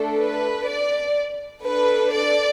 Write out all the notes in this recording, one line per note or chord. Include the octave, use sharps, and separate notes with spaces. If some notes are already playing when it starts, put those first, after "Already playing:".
Already playing: A3 D4 A4
B4
D5
D4 A4 B4
D5